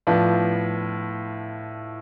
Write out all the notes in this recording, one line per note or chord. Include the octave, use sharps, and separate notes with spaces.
A2 F3 B3 D4 F4